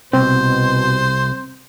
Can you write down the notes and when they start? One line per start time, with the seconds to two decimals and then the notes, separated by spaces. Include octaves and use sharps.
0.13 C2 B2 C4 C5